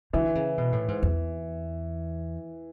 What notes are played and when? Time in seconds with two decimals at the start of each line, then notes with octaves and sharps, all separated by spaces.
0.13 D3 E3
0.35 C#3
0.58 B2
0.72 A2
0.88 G#2
1.03 E2